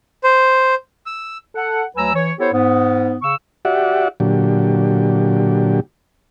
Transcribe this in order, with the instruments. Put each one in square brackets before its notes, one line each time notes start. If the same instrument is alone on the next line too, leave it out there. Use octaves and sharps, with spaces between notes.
[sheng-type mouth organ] C5
E6
[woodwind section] A4 F#5
D2 F#3 B4 G#5 A#5 E6
E3 C#5
B3 E4 G4 A4 C5 C#5
G#2 B3
C#3 C#6 E6
[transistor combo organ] F#4 G4 D5 E5 F#5
A#2 D3 F#3 G4